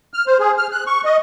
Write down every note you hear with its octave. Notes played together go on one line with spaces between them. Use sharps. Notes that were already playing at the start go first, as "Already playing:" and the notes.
F6
C5
G#4
F6
F#6
C#6
D#5